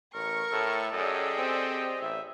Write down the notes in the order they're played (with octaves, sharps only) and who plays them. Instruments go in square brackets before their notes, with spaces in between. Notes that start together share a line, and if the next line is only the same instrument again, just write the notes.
[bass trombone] A1 [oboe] A#4 [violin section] C#6
[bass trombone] A2 [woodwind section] A4
[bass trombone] F#2 [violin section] G4 G#4 D5 [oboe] D#5
[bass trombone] C4
[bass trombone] A1 [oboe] E5